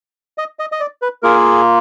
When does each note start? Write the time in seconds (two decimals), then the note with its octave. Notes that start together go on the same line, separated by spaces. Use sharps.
0.38 D#5
0.59 D#5
0.72 D#5
0.80 D5
1.02 B4
1.22 A#3 F4 G#4 A#4